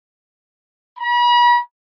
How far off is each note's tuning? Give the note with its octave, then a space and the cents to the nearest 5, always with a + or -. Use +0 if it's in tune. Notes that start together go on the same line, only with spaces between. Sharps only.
B5 -40